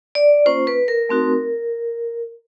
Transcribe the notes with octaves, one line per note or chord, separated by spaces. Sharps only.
D5
A#3 C#4 F4 C5
B4
A#4
A3 C4 D#4 F#4